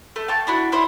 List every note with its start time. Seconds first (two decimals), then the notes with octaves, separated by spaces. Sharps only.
0.16 A3
0.28 F5 G5 A5 C#6
0.47 D4 E4 F#4
0.72 E4 C5 C#5 C#6